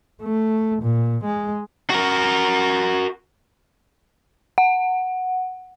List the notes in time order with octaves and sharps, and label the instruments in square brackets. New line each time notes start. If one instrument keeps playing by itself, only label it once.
[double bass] A3
A#2
G#3
[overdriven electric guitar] F#4 A#4
[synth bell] F#5